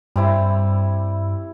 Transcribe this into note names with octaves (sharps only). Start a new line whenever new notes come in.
G2 G3 C4 E4